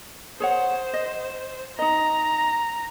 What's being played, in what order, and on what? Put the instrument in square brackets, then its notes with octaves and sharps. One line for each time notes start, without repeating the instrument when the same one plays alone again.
[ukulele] G#4 C#5 F#5 [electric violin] C5
[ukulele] D#5
[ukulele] D#4 D#5 [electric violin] A#5